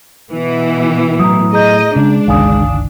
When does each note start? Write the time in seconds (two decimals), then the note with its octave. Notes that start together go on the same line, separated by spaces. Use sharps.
0.32 B2 E3
1.19 A2 F#3 A#5 D#6
1.53 G#4 D#5 A#5 G6
1.96 C#3 G#3 D4
2.28 G1 C#2 D#3 F5 G#5 D#6